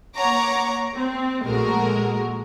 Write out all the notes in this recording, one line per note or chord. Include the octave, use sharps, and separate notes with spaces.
A#3 C#5 F#5 A#5 C#6 D6
C4
A#1 G#3 A3 F#4 A#4